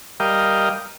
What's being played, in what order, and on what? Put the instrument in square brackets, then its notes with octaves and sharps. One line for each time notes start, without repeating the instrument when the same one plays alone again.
[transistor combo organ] G3 A#4 D#5 F5 G5